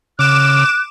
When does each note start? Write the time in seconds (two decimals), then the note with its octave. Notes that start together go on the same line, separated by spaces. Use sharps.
0.19 C#3 D6 F6 F#6 E7